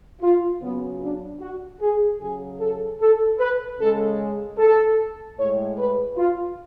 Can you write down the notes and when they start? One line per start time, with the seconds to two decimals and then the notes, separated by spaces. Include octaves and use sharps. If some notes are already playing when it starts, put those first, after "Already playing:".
0.21 F4
0.62 C#3 F#3 B3
1.01 D4
1.40 F#4
1.81 G#4
2.20 C#3 F#3 G#4
2.59 A4
3.00 A4
3.39 B4
3.79 C#3 G#3 A4
4.58 A4
5.38 A2 G#3 C#5
5.77 B4
6.17 F4